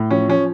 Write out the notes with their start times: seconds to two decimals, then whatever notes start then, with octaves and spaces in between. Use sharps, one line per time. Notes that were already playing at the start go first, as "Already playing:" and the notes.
Already playing: A2
0.11 F3 C#4
0.29 F3 C#4